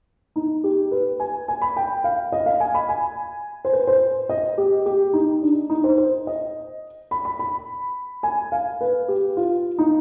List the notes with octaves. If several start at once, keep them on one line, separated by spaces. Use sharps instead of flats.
D#4
G4
B4
G#5
G#5
B5
G5
F5
D#5
F5
G#5
B5
G#5
C5
B4
C5
D#5
G4
G4
D#4
D4
D#4
C5
C5
D#5
B5
B5
B5
G#5
F5
B4
G4
F4
D#4